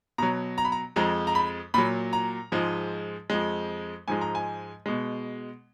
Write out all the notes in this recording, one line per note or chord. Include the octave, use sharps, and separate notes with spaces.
B2 F#3 A#5
A#5
B5
A#5
F2 F3 G#3 A#5
A#5
B5
A#2 F#3 B5
A#5
G#2 F3 G#3
F2 F3 G#3
G#2 F3 G#3 G#5
A#5
G#5
B2 G#3